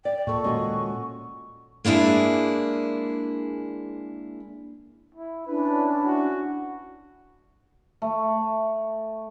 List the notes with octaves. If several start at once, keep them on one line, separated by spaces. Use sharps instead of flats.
D5 G5
A#2 A4 C#6
D#2 G#3 C#4 F#4 D#5
G#3 A#3 D4 E4 G#4
E4
C#4 D4 E4 B4
F#4
A3